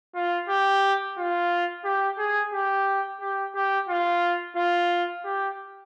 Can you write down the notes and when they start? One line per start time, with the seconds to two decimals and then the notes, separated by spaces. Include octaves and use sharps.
0.15 F4
0.49 G4
1.18 F4
1.85 G4
2.18 G#4
2.53 G4
3.21 G4
3.55 G4
3.89 F4
4.56 F4
5.25 G4